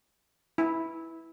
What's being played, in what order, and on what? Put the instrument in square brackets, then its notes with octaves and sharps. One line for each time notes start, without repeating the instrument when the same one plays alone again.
[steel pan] E4